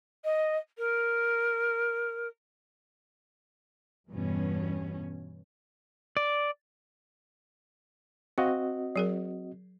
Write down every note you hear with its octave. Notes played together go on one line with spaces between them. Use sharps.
D#5
A#4
E2 G2 B2 E3 C#4
D5
C4 F#4 D#5 F5
F#3 G#4 A#4